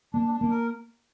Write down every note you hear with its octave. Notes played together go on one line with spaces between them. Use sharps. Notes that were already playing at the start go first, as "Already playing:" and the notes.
A#3 D4
D4
A#3
A#4